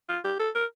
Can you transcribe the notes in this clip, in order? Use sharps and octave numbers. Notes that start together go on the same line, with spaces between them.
F4
G4
A4
A#4